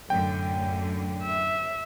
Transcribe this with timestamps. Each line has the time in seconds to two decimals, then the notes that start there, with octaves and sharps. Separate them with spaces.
0.10 F#2 A2 D3 G5
1.23 E5